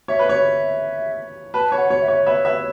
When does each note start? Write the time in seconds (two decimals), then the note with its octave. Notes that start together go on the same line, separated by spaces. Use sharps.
0.08 C#5 E5
0.19 B4
0.29 C#5
1.54 B4 A5
1.72 C#5
1.78 F#5
1.90 C#5
2.02 E5
2.08 C#5
2.26 B4 C#5 E5
2.45 B4 E5